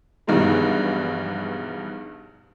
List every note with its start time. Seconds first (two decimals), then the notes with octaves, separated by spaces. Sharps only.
0.27 A#1 E2 G2 B2 D#3 G#3